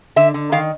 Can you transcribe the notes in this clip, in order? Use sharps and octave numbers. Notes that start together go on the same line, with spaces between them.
D3 E5
D3
D#3 F5